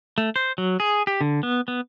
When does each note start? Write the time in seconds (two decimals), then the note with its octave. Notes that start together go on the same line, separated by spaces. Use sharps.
0.18 A3
0.36 C5
0.58 F#3
0.80 G#4
1.07 G4
1.21 D3
1.43 B3
1.68 B3